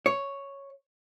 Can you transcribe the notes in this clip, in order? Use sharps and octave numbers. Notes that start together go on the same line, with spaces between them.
C#5